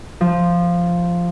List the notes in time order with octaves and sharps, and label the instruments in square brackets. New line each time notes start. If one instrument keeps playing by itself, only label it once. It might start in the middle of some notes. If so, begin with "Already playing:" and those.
[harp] F3